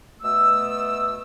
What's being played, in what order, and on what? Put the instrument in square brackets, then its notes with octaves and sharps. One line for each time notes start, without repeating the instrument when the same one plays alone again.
[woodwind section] B2 A3 D#6 E6